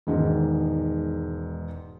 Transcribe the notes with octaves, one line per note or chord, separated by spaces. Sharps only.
E1 G#2 D#3